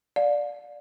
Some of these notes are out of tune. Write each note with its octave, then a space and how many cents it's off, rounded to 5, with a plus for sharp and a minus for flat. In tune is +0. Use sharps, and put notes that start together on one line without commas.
D5 +0 F5 +35